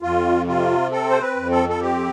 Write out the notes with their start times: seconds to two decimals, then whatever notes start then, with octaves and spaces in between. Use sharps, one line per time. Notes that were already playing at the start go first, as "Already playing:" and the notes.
0.02 F2 F4
0.47 C3 F4
0.92 C4 A4
1.10 C5
1.21 B4
1.36 F2
1.51 A4
1.69 A4
1.80 C4 G4